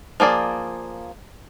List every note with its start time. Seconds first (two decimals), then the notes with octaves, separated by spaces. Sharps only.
0.20 F3 A#3 G#4 D5